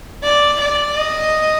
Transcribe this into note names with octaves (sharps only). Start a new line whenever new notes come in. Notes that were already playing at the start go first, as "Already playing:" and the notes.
D5
D5
D#5